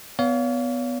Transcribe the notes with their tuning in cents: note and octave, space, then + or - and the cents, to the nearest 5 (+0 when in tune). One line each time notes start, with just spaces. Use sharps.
B3 +10 C#5 +45 F5 +0